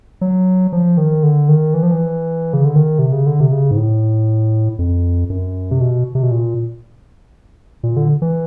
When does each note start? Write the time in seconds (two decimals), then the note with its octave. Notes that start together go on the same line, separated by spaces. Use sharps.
0.21 F#3
0.72 F3
0.97 D#3
1.23 D3
1.49 D#3
1.74 E3
1.83 F3
1.92 E3
2.53 C#3
2.65 D3
2.76 D#3
2.99 C3
3.13 C#3
3.26 D3
3.40 C3
3.52 C#3
3.71 G#2
3.77 A2
4.79 F2
5.30 F#2
5.71 C3
5.81 B2
6.15 C3
6.23 B2
6.31 A#2
7.83 A#2
7.97 D3
8.22 E3